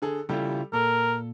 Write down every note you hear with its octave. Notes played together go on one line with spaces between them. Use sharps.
D3 G#4 A4
C#3 G3 E4 F4 G4 A4
A#2 A4 A#4